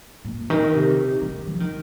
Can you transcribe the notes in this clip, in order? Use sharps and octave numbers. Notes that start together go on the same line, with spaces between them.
A#2
D#3
C3
D#3
F3
D#3